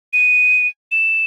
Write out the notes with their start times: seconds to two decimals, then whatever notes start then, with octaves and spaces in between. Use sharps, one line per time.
0.13 D#7
0.92 E7